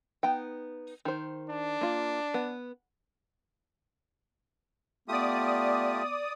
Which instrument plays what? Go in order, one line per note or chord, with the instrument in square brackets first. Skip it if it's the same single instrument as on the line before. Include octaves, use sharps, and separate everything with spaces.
[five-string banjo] B3 D#4 G5
D#3 C5
[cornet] D4
[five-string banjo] A#3 F4
B3
[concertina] A3 F4 G4 [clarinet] B3 [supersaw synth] D5 D#6